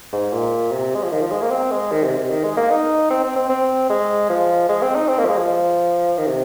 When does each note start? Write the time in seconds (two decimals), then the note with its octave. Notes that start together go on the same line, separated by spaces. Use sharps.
0.13 G#2
0.33 A#2
0.72 C3
0.95 G#3
1.04 F3
1.11 D#3
1.21 F3
1.32 G#3
1.42 A#3
1.51 C4
1.71 G#3
1.92 D#3
2.04 C3
2.18 C3
2.31 D#3
2.44 G#3
2.57 A#3
2.71 D#4
3.10 C4
3.24 C4
3.36 C4
3.49 C4
3.90 G#3
4.30 F3
4.69 G#3
4.82 C4
4.96 D#4
5.08 C4
5.19 A#3
5.25 F3
5.29 G#3
5.38 F3
6.18 D#3
6.27 C3